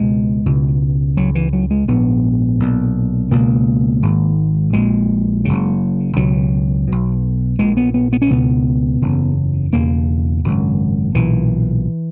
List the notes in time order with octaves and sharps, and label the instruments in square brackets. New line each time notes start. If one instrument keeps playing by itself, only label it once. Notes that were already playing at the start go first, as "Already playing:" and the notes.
Already playing: [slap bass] C#2 B2 G#3
C#2 B2
C#2 C#3 F#3
E3
F#3
G#3
A#1 G#2 B3
B1 A#2
C#2 B2 A#3
G#1 G#2
A#1 A#2 G#3
F#1 F#2 C#3
C#2 B2 F#3
B1 B2
A#1 A#2 G#3
B3
B3
B3
C#4
C#2 B2 B3
F#1 E2 C#3
E1 E2 C#3 A#3
G#1 F#2 C#3
B1 A#2 E3